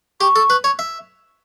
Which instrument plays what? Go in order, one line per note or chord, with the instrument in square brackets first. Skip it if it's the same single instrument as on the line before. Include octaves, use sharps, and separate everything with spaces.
[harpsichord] G4 [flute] C#6
[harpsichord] A4
B4
C#5
E5